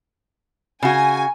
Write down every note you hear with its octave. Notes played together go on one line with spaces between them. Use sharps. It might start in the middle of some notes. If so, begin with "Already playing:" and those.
C#3 F#4 G#5